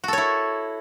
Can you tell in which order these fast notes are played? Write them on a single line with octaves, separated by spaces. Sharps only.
F#4 A4 C#5 E4